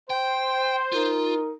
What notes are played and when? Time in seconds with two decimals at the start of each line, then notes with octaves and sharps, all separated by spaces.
0.10 C5 G5
0.92 D#4 F4 A#4